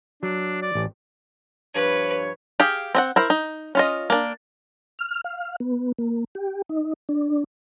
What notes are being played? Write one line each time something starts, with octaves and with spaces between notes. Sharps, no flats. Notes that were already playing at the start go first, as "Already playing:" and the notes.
F#3 D4
D5
A1
G2 F3 B4 C#5
G4 G#4 F5
C4 D#5 F#5
E4 A#4 C5
D#4
C#4 F4 D#5
A#3 D4
F6
F5
B3
A#3
G4
D#4
D4